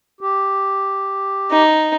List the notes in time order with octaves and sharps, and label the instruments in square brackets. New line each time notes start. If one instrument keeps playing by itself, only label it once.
[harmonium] G4
[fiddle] D#4